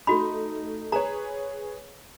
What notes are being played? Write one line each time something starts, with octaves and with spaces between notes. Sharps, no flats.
A3 D#4 F#4 B5
G#4 B4 C#5 A#5